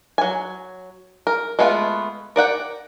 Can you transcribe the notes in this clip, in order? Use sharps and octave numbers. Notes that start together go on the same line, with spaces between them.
F#3 G#5
A#4
G#3 A3 B3 D4 F4
A#4 D5 F#5 G5